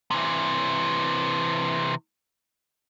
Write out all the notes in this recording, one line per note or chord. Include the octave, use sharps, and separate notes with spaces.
C3 E3